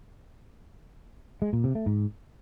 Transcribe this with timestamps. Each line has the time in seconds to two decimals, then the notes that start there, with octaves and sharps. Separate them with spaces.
1.42 G#3
1.53 A#2
1.64 C3
1.75 A3
1.86 G#2